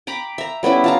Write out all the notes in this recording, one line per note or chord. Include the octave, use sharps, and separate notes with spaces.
G5 A#5 B5 D6
E5 A#5
G3 B3 C#4 E4
F4 A5 A#5